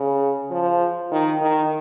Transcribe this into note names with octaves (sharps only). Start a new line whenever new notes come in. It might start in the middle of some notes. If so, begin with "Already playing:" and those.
Already playing: C#3
F3
D#3
D#3